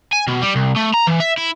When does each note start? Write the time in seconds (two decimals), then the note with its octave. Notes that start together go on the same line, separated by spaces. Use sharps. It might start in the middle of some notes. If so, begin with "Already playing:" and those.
0.13 G#5
0.28 B2
0.42 G3
0.56 C2
0.76 A3
0.94 A#5
1.07 E3
1.20 E5
1.38 E4